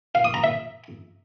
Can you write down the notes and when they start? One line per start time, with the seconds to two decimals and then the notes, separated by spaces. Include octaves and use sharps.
0.15 F5
0.24 D#6
0.34 A#5
0.44 E5